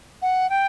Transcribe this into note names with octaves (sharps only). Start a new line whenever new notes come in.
F#5
G5